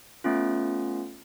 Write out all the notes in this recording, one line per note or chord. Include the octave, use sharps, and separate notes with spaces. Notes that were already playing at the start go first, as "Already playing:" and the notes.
A3 B3 C#4 F4